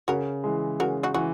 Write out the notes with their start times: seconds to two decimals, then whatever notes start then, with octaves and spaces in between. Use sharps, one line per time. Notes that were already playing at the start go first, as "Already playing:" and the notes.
0.08 C#3 F#4 A#4
0.44 E3 G#3
0.79 C#3 F#4 A#4
1.03 D#4 F#4
1.14 E3 F#4